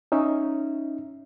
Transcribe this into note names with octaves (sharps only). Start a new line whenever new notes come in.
C#4 D#4 E5